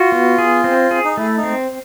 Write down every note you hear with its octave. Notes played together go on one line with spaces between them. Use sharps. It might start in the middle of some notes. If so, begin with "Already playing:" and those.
Already playing: F4 F#4
B3
G#4
C4
G#4
D#4
A3 E4
D#4
C4